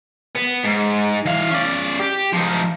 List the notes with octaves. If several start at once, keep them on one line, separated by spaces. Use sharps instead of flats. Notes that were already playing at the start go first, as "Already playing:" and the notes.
B3
G#2
E3 F5
C#4 D5
G4
F3 D#4